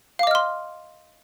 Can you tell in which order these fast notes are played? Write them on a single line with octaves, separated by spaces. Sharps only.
F5 D6 D#5 F6 C6